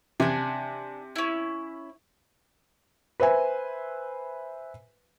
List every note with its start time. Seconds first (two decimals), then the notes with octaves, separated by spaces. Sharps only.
0.20 C3 D4 G#5
1.16 C#4 E4
3.20 B4 C5 E5 G#5